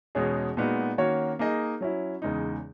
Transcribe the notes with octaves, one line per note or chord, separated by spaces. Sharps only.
E2 B2 G#3 C#4 G#4
A#2 G#3 B3 D#4 F#4
D#3 A#3 C#4 F#4 C#5
A#3 D#4 G#4 D#5
F#3 C#4 E4
E2 C#3 G#3 D#4